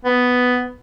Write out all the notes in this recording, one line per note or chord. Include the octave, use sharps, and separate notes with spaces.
B3